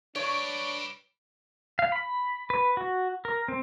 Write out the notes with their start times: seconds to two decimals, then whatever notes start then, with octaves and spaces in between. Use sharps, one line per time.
0.16 D4 G4 B4 C#5 D7
1.79 F5
1.92 B5
2.50 B4
2.77 F#4
3.25 A#4
3.48 C4